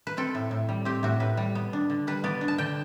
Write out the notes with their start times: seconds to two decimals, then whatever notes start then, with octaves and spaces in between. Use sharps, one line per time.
0.07 B4
0.17 C4 A4
0.35 A2
0.51 A2
0.69 G3
0.85 C4 G4
1.03 A2 F#4
1.20 A2 B4
1.37 G3
1.55 B3
1.73 D4
1.90 D3
2.07 G3 B4
2.24 B3 D5
2.41 D4
2.48 A5
2.58 D3 G5